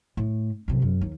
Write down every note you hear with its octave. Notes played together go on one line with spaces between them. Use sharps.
A2
F#2 C3
F#2
D#2